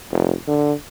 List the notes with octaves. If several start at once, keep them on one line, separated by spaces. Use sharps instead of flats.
F1
D3